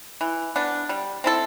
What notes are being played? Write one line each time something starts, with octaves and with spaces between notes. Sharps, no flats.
E3
B3 D4
G3
C4 E4 A4